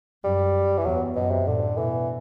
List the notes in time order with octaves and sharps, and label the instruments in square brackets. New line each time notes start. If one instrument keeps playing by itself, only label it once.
[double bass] F#2 [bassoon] G3
[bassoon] E3
[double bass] E2 [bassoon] F#3
[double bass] F#2 [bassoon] B2
[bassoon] C3
[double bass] A2 [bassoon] D3
[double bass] B2 [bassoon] E3